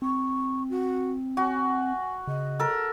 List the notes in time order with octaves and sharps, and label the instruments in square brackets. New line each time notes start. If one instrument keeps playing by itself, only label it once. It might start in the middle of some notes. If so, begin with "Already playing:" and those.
[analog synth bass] C4 [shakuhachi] C#6
[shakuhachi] F#4
[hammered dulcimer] F#4 [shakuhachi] G#5
[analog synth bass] C#3 [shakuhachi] D#5
[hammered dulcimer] A4 A#4